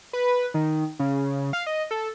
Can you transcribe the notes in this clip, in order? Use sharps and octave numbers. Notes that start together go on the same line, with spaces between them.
B4
D#3
C#3
F5
D#5
A4